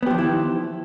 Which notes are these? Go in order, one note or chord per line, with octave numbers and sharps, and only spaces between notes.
D#3 F3 B3 E4 G4